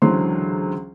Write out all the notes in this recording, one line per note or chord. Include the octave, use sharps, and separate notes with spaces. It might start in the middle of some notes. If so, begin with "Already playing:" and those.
C#2 D3 E3 F#3 C5 C6